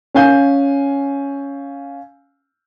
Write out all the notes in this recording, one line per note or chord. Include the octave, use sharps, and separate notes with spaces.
C#4 F5 G#5 G6